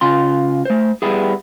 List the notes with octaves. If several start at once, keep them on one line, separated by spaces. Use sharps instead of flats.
C#3 F4 C6
A3 C5
G3 B3 E4 G#4